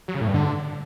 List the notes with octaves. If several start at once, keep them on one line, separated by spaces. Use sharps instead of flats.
F#3
C#3
A2
G2
D3